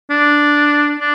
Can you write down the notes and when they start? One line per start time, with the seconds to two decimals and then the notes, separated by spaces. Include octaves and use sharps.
0.10 D4
1.00 D4